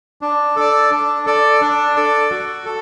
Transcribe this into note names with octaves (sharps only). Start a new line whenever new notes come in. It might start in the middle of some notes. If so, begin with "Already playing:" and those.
D4
A4 D5
D4
A4 D5
D4
A4 D5
F#4
A4